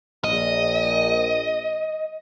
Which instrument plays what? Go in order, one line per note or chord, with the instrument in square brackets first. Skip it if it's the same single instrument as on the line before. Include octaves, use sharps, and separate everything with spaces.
[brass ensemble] A#1 [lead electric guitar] D#5